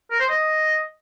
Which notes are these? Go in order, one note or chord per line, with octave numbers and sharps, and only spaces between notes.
A#4
C5
D#5